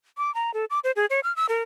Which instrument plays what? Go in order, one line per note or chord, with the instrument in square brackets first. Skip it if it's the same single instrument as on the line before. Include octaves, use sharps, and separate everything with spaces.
[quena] D6
A#5
A4
D6
C5
G#4
C#5
F6
E6
A#4